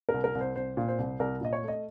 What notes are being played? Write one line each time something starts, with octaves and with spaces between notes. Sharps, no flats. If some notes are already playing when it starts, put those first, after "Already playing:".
A#4
C2
A#4
C2
C5
C2 C5
A#2
C5
C2
C2 A#4
A#2 D#5
C#5
A3
D#5